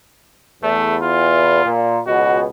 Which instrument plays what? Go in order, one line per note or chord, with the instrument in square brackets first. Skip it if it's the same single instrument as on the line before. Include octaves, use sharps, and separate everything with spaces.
[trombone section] E2 [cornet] A3
[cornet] F4
[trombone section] A#2
[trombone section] C#2 B2 [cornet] F#4